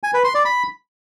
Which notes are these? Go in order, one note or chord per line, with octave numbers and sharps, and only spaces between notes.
G#5
B4
C6
D5
B5